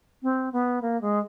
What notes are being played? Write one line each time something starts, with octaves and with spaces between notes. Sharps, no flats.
C4
B3
A#3
G#3